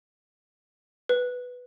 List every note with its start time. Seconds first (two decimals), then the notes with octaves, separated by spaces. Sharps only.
1.09 B4